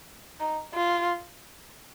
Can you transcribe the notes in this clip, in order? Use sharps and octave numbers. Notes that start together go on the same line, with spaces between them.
D#4
F4